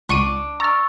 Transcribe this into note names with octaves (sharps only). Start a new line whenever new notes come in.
C#2 D4 C#6 D#7
A#5 C#6 E6 F6 A6